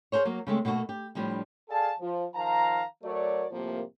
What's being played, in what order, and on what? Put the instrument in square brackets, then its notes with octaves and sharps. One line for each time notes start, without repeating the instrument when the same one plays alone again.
[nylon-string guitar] G#4 A#4 C5 C#5
F#3 A#3
C#3 G#3 A3 C4
B2 A3 A#3 D#4 F#4 A4
G4
A2 F3 G3 D4
[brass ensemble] G#4 A4 D5 F5 G#5 A5
F3
D#3 F3 F5 A5 A#5
F#3 A3 F#4 A#4 C#5 D5
C2 A2 C3 F3 A#3